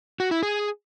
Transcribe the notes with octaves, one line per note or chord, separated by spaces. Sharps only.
F#4
E4
G#4